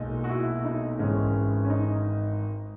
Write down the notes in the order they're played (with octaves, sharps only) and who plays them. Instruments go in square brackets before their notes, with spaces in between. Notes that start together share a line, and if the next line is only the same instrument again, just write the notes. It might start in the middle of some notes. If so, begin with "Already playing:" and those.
Already playing: [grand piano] B1 A#2 G#3 D#4
F#4
E4
D#4
G#1 G#2 E3 G#3 C#4
C#4
D#4